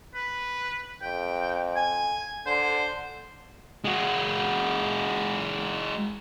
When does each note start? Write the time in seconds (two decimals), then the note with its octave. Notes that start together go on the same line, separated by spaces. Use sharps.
0.14 B4
1.02 F2 G5
1.76 G#5
2.47 D3 C5
3.84 G#3 F#4